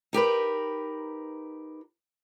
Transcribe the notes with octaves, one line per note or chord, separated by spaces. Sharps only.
D#4 G4 A#4 B4